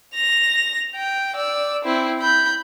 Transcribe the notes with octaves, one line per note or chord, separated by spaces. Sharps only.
A#6 F7
G5
D5 E6
C4 E4
B5 G6